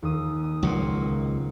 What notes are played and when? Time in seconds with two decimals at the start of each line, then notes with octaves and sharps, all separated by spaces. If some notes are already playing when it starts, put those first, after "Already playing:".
0.02 D#2 D#6
0.44 D#6
0.63 C#2 A#2 F#3 C4